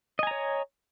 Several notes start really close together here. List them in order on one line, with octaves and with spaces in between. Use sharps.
D#5 G#5 A#5 C#5